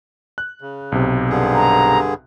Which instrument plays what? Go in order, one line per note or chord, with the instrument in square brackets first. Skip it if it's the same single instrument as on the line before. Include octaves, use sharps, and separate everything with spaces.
[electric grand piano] F#6
[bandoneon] C#3
[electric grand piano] B1 C3
[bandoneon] G2 D3 G#4
[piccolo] A#5